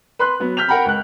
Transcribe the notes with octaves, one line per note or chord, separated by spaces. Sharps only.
B4 C6 F#6
F#3 B3
F6 G6 B6 F7
A#4 F#5 G5 A#5 B5
C#2 F#6